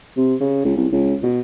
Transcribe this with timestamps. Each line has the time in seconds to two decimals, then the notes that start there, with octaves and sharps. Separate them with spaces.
0.17 C3
0.40 C#3
0.65 C#2
0.77 C2
0.92 C#2
1.23 B2